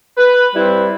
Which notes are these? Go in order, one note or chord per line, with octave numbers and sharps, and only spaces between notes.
B4
G3 C4 E4 B4